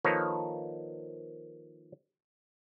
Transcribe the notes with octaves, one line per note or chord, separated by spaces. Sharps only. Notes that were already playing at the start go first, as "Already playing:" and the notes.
D#3 F3 A#3 A4 B4 C#5